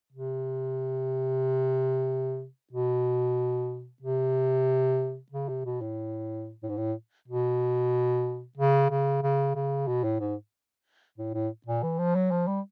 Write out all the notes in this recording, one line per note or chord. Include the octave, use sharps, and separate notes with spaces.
C3
B2
C3
C#3
C3
B2
A2
A2
G#2
A2
B2
C#3
C#3
C#3
C#3
B2
A2
G#2
A2
A2
A#2
E3
F3
F#3
F3
G3